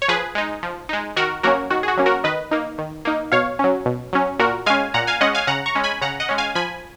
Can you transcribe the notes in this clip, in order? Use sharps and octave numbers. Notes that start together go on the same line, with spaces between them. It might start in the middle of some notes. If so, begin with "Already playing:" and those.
C#5
F3 G#4 B4
G#3 D#4
F3
G#3 D#4
D#3 F#4 A#4
F#3 A#3 C#4 F#4 A#4
D#3 F#4
G#4
F#4
F#3 A#3 C#4
F#4 A#4
D#3 B4 D#5
A#3 D#4
D#3
A#3 D#4
B2 C#5 F5
F#3 C#4
B2
F#3 C#4
A#2 F#4 A#4
G#3 C#4 F5 G#5
A#2 F#5 A#5
F5 G#5
G#3 C#4 D#5 F#5
F5 G#5
C#3 F#5 A#5
A#5 C#6
G#3 C#4
G#5 B5
C#3 F#5 A#5
D#5 F#5
G#3 C#4
F5 G#5
F3 G#5 B5